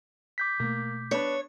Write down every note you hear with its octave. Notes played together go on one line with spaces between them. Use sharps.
D6 G6 B6
B2 A3 A#3
B3 D4 B4 C#5